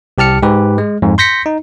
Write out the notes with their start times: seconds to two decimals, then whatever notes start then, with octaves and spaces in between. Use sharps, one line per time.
0.18 C2 G4 A5 F6 C#7
0.42 G#2 G4 B4
0.78 G#3
1.02 F2 G#2
1.18 C6 G6 A#6 B6 C#7
1.46 D#4